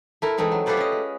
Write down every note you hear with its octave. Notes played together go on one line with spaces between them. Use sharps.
A3 E4 A#4
E3 G#3 A3 C4 D#4
F#3
F4 G4 A4 B4 C5 D5
C#4 D#5
G#3